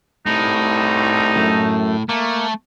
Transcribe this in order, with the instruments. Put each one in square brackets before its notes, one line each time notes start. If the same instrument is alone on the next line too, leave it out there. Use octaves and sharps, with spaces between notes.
[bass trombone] C2 [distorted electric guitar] A2 [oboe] D#4
[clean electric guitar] F#2 A3
[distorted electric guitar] A3 [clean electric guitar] A#3